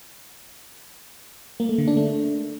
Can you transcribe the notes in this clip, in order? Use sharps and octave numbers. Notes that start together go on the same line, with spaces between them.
A#3
A3
D3
D4
A3